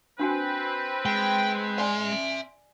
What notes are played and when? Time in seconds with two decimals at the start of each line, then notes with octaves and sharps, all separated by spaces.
0.19 C4 D4 F#4 B4 G#5
1.05 G#3 G5
1.78 D5 E5 G#5 C6